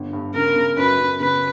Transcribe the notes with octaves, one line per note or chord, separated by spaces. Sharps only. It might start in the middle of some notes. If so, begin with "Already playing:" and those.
Already playing: G1
G2
C#3 A#4
C#3
F#2 B4
F#2
C#3 B4